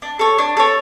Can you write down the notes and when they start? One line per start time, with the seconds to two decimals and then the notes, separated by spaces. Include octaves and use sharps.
0.02 D4
0.19 A4 C#5
0.38 D4
0.57 A4 C#5